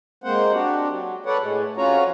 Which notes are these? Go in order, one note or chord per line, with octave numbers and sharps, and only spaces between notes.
G#3 A#3 C4 C5 F#5
D4 F#4 G4
F#3
A4 B4 C#5 D5 F#5
A2 G#3
F2 C#4 F4 F#4 C#5 A#5